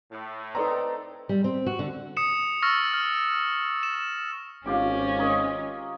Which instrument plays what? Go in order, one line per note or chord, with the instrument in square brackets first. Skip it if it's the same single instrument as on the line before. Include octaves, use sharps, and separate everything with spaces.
[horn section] A2
[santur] C4 D#4 [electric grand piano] A4 D5 A#5 [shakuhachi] B4
[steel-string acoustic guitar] G3
C4
F#4
D3
[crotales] D#6 C#7 E7
C#6 E6 F6 A6 A#6
F6
E7
[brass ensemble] G#1 [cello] C#4 [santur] F4 G4 D6
[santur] A#4 C#5 D#5